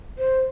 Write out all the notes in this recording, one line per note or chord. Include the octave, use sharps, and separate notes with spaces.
C5